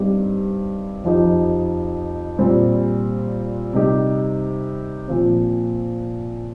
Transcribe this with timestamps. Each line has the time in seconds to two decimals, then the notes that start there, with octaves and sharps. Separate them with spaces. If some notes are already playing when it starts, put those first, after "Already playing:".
Already playing: G2 G3 C4 D#4 G4
1.04 F2 F3 D#4 G4
2.39 A#2 G3 C4
3.73 C3 G3 D#4 G4
5.08 A#2 F3 C4